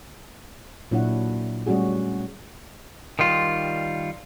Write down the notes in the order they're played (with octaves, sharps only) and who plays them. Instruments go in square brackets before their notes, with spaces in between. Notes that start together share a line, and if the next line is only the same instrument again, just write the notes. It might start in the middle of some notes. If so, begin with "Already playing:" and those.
[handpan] A#2 F#3 D4 E4 C#5 F#5
G3 A3 C#4 F#4 G#4
[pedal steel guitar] D#3 G3 F4